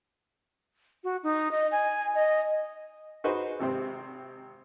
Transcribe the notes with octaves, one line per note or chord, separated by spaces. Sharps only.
F#4
D#4
D#5
G#5
D#5
D#4 F#4 G#4 B4 C5
G#1 C3 C4